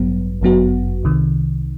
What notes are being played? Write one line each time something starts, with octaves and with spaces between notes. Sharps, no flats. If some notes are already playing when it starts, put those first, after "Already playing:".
Already playing: A1 G2 F#3 B3
G1 F#2 F#3 B3 F#4
C2 C3 D#3